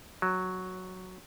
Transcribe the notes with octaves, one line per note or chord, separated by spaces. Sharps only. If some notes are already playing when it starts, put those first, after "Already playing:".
F#3